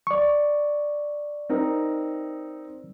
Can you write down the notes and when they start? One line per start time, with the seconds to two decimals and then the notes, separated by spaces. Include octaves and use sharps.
0.07 D5 C#6
1.49 C4 D#4 A#4